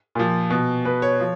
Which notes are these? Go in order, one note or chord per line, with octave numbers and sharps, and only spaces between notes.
A#2 F3
B2
B2 B4
C#5
F3